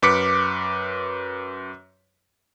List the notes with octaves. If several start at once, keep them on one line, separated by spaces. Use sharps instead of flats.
F#2 B4 D6 B6 C#7